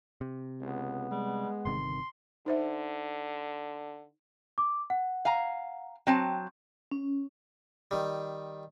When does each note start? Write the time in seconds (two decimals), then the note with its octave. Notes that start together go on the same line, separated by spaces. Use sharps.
0.21 C3
0.61 C#2 B3
1.11 G3 G#3
1.65 G1 C3 D#3 C6
2.46 D3 D#4 C5 E5
4.58 D6
4.90 F#5
5.25 F5 G#5 A#5
6.07 F#3 C4 G5 A5
6.91 C#4
7.91 D#3 G3